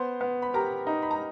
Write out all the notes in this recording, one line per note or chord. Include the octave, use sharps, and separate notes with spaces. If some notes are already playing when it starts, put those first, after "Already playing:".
Already playing: B3 C5 C6
B3
B5
G4 A#4 A#5
D#4
B5
A#5